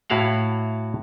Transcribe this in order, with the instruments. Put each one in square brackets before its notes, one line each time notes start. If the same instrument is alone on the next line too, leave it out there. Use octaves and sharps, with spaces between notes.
[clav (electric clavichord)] A2 E4 F#4 F5 F#5